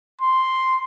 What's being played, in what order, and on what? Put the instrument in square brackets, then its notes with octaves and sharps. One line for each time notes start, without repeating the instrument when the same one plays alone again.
[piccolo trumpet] C6